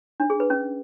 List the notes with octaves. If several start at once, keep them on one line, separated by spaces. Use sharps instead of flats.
D4
G#4
B4
C#4